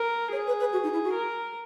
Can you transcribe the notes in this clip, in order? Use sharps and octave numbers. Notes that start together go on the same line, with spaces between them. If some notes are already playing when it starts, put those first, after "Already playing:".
Already playing: A#4
G#4 C#5
B4
B4
F#4
D#4
E4
F#4
A#4